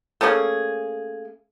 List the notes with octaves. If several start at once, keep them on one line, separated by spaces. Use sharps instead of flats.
A3 A#3 C#4 G#4